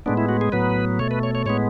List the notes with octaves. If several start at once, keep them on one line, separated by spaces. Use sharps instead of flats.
A2 G#3 B3 D4
E4
F#4
G#4
A2 F#3 B3 B4
B2 A3 C#5
B4
C#5
C#5
A2 G#3 B3 C#5